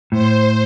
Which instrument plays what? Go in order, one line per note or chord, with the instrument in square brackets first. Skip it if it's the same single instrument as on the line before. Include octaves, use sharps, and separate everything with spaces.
[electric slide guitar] A2 [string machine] C5